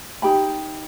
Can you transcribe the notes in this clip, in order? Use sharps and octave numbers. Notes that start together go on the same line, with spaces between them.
D#4 G4 G5 B5